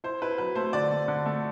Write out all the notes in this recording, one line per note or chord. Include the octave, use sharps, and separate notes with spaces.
E4 C5
E4 B4
F#3 B4
A3 C5
D3 D5
A3
D3
A3